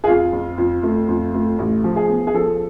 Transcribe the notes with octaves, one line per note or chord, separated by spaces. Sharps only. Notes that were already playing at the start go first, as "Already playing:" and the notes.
G#4
F2 F4
F2
F2
A3
F2
A3
A1
F3
G#4
B3
G#4
F3 A4